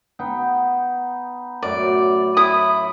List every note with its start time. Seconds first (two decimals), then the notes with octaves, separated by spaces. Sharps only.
0.19 B3 D#4 G5
1.63 F#2 A2 D5
2.37 E4 D#6